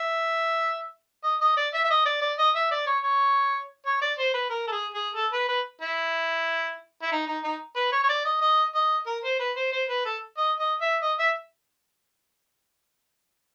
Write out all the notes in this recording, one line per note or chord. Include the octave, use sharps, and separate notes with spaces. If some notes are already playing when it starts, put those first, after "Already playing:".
Already playing: E5
D#5
D#5
D5
E5
E5
D#5
D5
D5
D#5
E5
D5
C#5
C#5
C#5
D5
C5
B4
A#4
A4
G#4
G#4
A4
B4
B4
E4
E4
D#4
D#4
D#4
B4
C#5
C#5
D5
D#5
D#5
D#5
A#4
C5
B4
C5
C5
B4
A4
D#5
D#5
E5
D#5
E5